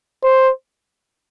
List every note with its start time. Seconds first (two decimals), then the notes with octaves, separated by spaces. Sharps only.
0.23 C5